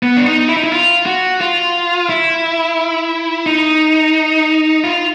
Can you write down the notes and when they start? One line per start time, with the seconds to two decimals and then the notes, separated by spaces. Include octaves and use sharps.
0.03 B3
0.17 D4
0.26 D#4
0.49 E4
0.57 D#4
0.64 E4
0.72 F4
1.06 F#4
1.41 F4
2.09 E4
3.46 D#4
4.84 F4